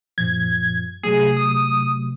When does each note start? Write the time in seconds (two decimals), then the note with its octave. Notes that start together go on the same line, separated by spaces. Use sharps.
0.18 F#2 A#2 F3 G#6
1.03 C3 F#3 A3 G#4
1.37 D#6